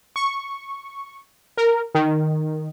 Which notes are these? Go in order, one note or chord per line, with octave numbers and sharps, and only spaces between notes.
C#6
A#4
D#3